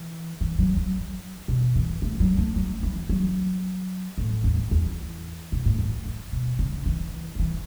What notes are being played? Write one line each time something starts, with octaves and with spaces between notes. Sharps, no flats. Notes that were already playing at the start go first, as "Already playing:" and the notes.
Already playing: E3
E3
F#3
F#3
B2
E3
A3
F#3
A3
F#3
E3
F#3
A2
E2
E2
B2
A2
F#2
A2
B2
C#3
E3
F#3
E3